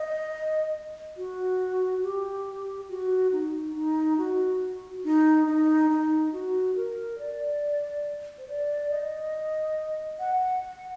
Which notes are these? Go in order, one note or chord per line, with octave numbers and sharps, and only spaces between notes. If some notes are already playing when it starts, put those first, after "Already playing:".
Already playing: D#5
F#4
G4
F#4
D#4
D#4
F#4
D#4
D#4
D#4
F#4
A#4
D5
C5
D5
D#5
F#5